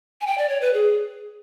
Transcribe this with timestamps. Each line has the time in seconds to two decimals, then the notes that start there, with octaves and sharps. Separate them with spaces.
0.21 G#5
0.27 G5
0.38 D5
0.49 C#5
0.61 B4
0.74 G#4